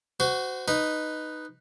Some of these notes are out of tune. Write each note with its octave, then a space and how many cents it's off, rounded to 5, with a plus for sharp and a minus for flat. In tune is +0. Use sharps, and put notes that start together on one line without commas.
F#4 +10 C5 -25
D#4 -5 B4 +0